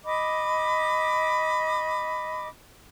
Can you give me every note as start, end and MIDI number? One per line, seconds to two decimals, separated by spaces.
0.05 2.48 75
0.05 2.48 83
0.05 2.48 86